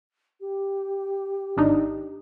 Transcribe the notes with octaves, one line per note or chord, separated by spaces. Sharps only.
G4
G#1 D4 D#4